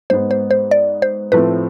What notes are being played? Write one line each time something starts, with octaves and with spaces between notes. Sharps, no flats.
G#2 G#3 B3 C5
C5
C5
D5
C5
A2 F3 A3 C4 B4